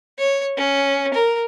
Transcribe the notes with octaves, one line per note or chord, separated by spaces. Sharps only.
C#5
C#4
A#4